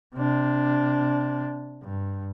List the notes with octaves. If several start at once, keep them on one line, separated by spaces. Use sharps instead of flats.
C3 D4
G2